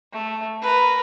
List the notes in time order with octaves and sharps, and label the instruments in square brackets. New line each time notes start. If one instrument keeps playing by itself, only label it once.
[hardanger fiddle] A3
A#4 B4